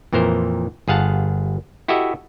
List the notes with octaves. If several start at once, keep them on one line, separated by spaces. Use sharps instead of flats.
F2 A#2 E3 A#4 C5
G1 G#4 F5 F#5 A5
E4 F#4 G4 A4 D#5 E5